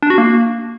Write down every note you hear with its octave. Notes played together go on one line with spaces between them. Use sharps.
D4
F#4
A#3